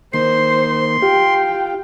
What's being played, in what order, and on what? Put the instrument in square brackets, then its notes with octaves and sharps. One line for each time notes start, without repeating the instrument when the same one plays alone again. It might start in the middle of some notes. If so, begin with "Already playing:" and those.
[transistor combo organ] D#3 A#3 [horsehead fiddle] C5 [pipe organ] C6
[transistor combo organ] F4 [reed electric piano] G4 [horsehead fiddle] G5